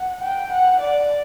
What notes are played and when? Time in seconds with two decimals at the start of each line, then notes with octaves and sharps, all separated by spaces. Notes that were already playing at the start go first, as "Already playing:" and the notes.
Already playing: F#5
0.23 G5
0.52 F#5
0.80 D5